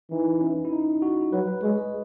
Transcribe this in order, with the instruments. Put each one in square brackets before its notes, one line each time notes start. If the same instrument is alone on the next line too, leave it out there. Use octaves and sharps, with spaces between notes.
[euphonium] E3 [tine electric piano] D#4
[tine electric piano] C#4
E4
D#4
F#4
[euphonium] F#3 [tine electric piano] B4
[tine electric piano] B4
[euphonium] G#3 [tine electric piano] C#5
[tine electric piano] D#5